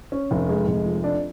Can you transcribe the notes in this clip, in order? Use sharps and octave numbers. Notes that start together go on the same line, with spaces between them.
C#4
F1
G#3
F1
F3
D4